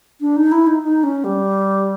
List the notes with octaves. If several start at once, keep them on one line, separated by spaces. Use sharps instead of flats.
D4
D#4
E4
D#4
D#4
C#4
G3